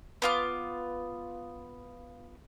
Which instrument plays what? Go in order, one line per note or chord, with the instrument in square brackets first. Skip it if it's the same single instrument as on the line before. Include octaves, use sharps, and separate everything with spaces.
[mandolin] B3 F4 D6